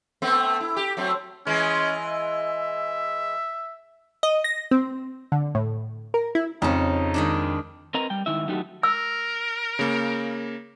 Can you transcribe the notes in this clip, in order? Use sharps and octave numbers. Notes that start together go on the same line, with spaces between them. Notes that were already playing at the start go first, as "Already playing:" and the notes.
A3 B3 C4
E4
G4
F#3 A3 C4
E3 G#3 C#4
E5
D#5
A#6
C4
D3
A2
A#4
E4
F2 C#3 C#4 D#4
D#3 G#3 D4
C4 A#4 B4 D#5 A#5
G3 G5
G#2 D#3 E4 E5
F#3 A3 D#4 F#4 G4
A#4 E6
C#3 A#3